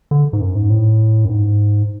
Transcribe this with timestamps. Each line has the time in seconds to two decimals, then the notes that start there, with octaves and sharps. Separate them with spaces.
0.11 D3
0.33 G#2
0.40 F#2
0.55 G#2
0.70 A2
1.25 F#2
1.29 G#2